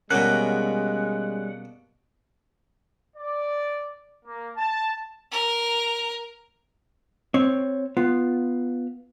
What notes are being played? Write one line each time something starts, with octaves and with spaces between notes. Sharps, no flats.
B2 G3 G#3 A#3 C#4 F#5
D5
A#3
A5
A#4
C4 C#5
B3 F4